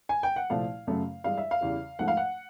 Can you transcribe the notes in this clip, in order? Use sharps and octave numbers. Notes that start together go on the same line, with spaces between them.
G#5
G5
F#5
C2 A#2 F3 A3 F5
F#2 C#3 F#3 A3
G2 E3 G#3 F5
E5
F5
E2 C#3 E3 G3
G#2 F3 A3 F#5
F5
F#5